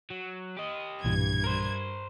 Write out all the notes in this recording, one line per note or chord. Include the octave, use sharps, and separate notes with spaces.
F#3
G4 D#5
B1 G2 A#2 E3 G#6
A#4 C5